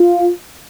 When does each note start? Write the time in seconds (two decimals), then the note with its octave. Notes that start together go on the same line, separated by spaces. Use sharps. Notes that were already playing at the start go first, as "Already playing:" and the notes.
Already playing: F4